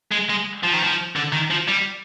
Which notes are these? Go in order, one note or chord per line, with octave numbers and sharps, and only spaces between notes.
G#3
G#3
F3
D#3
F3
D3
D#3
F3
G3